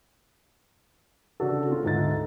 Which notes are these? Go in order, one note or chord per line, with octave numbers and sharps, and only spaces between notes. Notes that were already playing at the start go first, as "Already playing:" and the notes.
C#3 D4 F#4 A4
C4 F4
D2 G#2 D#4 A4 A6